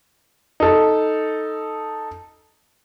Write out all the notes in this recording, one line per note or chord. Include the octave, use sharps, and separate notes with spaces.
D#4 A4